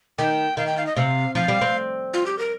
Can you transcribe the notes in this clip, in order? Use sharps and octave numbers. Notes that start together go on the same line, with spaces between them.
D#3 G5
D#3 F5
G5
F5
D#5
C3 F5
F3 F5
G3
C4
F4
G4
A#4